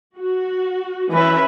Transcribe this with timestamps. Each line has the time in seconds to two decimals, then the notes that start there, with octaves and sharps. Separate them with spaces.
0.17 F#4
1.12 E3 C#4 B4 E5